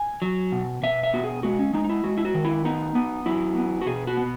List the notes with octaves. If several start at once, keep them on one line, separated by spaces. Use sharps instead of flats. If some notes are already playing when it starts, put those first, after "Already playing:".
Already playing: G#5
F#3
B2
B2 E5
E5
B3 F#4
G#4
G#3 F#4
C#4
G#3 D#4
D#4
E4
G#3 F#4
E4
F#4
D#3
E4
B3 D#4
B3
F#3 E4
B3
F#4
B2 G#4
F#4
B3